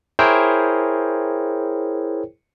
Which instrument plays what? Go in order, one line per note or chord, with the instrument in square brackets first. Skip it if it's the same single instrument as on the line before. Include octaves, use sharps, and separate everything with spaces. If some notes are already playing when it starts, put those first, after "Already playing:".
[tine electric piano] E4 G#4 A#4 C5 C#5 G5